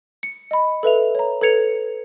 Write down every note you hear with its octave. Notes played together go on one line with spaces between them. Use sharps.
C#7
D#5 B5
A4 B4 E5 F7
C#5 A#5
A4 B4 G#6 C#7 F7